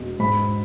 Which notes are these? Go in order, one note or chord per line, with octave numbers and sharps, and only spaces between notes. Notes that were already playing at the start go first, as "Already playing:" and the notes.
Already playing: E1 B2
G#2 B5